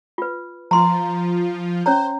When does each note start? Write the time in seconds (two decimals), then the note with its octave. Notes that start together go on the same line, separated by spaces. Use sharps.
0.18 F4 B4
0.71 F3 F4 A#5 C6
1.86 C#4 C5 C#5 A#5